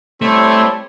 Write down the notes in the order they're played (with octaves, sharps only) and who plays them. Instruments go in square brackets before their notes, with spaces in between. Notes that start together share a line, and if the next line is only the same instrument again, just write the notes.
[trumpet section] G3 C4 E4 A4 C#5 [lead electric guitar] A3